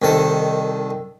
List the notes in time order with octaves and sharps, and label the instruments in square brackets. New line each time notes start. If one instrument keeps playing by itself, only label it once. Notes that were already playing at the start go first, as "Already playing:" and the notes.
[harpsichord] C2 D#3 A4